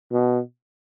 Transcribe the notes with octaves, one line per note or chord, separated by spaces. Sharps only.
B2